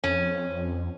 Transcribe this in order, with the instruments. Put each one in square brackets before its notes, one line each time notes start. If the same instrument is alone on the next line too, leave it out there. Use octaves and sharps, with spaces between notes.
[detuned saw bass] F2 [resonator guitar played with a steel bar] C#4